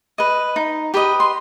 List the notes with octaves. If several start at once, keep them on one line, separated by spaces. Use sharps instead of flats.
B4 D#5
D#4
G4 B4 D#5
C6